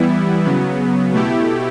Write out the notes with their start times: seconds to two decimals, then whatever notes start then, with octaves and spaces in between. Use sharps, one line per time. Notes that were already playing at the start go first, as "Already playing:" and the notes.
Already playing: E3 G3 B3 E4
0.45 C#3 F#3 B3
1.12 B2 A3 E4 G4